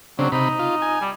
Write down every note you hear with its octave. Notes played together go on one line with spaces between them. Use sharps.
C#3 F#3 C4 D4
C3 D#4 B5
F4
G#5
G3